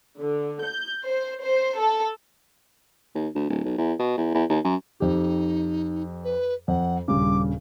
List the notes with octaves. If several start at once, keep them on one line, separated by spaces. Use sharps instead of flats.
D3
G6
C5
C5
A4
D#2
D2
D1
B1
E2
B2
E2
E2
D#2
F#2
F2 D#4 G4
B4
F2 F#5
D#1 G2 C#3 D6